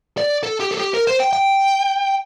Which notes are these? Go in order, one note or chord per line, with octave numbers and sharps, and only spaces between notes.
D5
A4
G4
A4
G4
A#4
C5
G5
G5